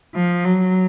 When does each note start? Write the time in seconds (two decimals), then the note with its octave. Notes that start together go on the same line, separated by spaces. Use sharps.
0.15 F3
0.45 F#3